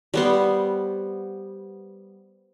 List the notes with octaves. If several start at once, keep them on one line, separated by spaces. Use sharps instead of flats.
G3 B3 C5